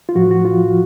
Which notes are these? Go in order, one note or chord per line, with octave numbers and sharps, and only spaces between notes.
F4
A2 F3 F#4
F#4
F4